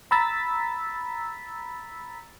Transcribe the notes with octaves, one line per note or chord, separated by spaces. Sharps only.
A#5 B5 E6 A6 B6